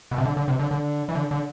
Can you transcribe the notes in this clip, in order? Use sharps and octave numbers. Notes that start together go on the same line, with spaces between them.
B2
C3
D3
D3
C3
D3
D3
E3
D3
D3